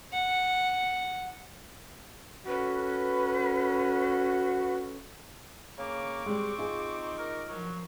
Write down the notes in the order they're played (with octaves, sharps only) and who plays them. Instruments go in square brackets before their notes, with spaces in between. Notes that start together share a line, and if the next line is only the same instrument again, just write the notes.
[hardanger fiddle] F#5
[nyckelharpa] C#4 A4 [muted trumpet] F#4 [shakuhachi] B4
[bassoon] C#3 [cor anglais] A#3 [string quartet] C#6 D6
[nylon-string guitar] G3 G#3 [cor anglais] C4
[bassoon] D#4 [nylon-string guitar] F4 G#4
[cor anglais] A#4
[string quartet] F3 A#4 [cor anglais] F#3